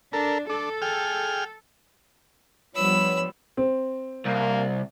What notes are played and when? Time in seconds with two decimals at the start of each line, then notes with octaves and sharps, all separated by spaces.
0.13 D4 A4 A#4
0.50 D4 A4
0.82 G#4 G5 F6
2.75 F3 G3 B3 D4 B4 C#5 B5 E6
3.57 C4
4.25 C2 A#3